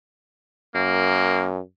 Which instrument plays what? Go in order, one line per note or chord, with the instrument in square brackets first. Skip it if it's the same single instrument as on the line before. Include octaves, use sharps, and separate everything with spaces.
[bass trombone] F#2 [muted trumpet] A#3